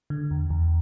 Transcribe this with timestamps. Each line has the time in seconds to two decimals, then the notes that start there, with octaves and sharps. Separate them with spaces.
0.10 D3
0.31 E2
0.50 E2